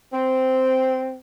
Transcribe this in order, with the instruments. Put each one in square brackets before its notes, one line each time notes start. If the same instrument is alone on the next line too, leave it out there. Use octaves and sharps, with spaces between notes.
[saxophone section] C4